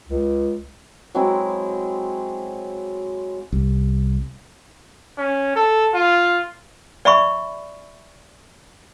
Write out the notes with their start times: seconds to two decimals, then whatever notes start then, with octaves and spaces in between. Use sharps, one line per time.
0.09 C#2
1.15 F#3 G#3 C4 E4
3.53 C2
5.18 C#4
5.55 A4
5.94 F4
7.05 D5 E5 B5 C#6